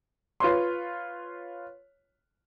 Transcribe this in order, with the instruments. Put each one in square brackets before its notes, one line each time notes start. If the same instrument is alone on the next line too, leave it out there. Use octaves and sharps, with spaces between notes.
[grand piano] F4 B4 C#5 C6